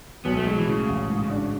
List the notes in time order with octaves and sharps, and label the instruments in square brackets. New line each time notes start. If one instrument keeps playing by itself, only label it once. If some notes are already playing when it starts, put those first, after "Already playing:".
[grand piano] B1 [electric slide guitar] B3
[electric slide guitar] A3
[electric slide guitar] F#3 [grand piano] G#3
[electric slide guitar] E3
[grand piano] A2 [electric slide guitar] C#3
[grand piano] A1
G#2
D4